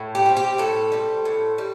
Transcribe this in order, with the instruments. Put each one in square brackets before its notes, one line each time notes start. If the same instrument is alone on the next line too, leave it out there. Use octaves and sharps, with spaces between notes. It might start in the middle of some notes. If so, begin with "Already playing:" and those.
Already playing: [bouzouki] A2
G4
G3 C4
G4
A2 A4
G3 C4
A2
G3